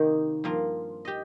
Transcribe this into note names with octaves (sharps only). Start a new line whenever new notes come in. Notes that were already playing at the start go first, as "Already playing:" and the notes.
Already playing: C3 D#3 A#3 D#4 G4
G2 F3 A#3 F4
G4 D#5